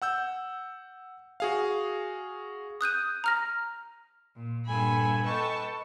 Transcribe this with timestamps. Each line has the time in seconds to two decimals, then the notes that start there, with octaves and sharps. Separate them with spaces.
0.02 F#5 E6 G6
1.40 F#4 G#4 F5
2.81 D#6 F#6 G6 D#7
3.24 A#5 F6 A#6
4.36 A#2
4.66 G2 A#2 A4 G#5 B5
5.24 A4 B4 D#5 G5 A5 C#6